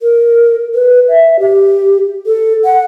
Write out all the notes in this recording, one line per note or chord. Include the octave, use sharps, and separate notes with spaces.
A#4
B4
E5
G4
A4
F#5